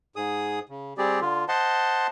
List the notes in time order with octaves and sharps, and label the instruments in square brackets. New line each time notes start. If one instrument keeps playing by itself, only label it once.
[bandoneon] G#2 G#4 D#6
C#3
G3 C4 G4 G#4 D5
D3 F4
C5 D#5 F#5 A5 C6